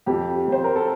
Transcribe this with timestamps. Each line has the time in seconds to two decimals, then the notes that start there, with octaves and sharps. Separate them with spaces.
0.06 F2 G4
0.48 F2 C5
0.64 A#4
0.76 A4